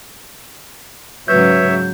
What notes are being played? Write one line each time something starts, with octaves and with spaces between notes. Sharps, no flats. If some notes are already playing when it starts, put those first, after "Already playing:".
G#2 C#3 F#3 B4 C#5 E5 G6